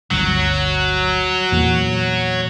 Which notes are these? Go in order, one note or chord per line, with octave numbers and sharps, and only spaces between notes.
G1 D2 F#3
E2 A#2